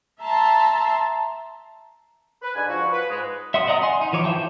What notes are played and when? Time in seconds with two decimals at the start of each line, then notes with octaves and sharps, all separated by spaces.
0.21 E5 A5 A#5 C6
2.42 B4
2.55 G#2 D3 G#5
2.68 F3 F#4
2.92 B4
3.10 G#2 G#3
3.54 E5 F#5 C6 D#6
3.67 D5 D#5 F#5 A#5 D#6
3.82 F#5 G#5 C6
4.01 D#4
4.13 E3 F3 C#5 D6
4.24 B4 C5 E5 G5 A5